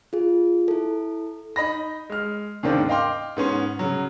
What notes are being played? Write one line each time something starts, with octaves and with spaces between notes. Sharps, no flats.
F4 G#4
E4 A4
D#4 D#5 B5 A#6
G#3 F6
D#2 G#2 C#3 A#3 C4 D4
D#5 F5 G5 C6 D6
G#2 B3 C#4 C6
C#3 F#3